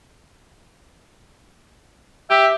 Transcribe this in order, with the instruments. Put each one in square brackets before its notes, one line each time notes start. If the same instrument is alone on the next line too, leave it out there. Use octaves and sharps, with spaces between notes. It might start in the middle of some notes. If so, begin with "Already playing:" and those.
[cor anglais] G4 [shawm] E5